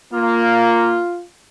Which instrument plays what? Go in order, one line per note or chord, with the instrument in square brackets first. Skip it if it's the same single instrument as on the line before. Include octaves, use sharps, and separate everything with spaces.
[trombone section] A#3 [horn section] F4